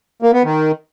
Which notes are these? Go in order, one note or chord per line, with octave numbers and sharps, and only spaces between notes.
A#3
B3
D#3